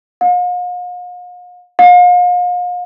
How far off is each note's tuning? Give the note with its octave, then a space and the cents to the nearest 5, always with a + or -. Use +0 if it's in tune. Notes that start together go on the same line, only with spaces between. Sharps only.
F5 +45
F5 +40